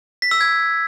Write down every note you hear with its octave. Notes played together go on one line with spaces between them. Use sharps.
B6
E6
G#6